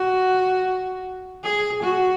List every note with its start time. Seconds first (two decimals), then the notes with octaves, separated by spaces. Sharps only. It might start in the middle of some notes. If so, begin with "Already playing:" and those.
Already playing: F#4
1.44 G#4
1.83 F#4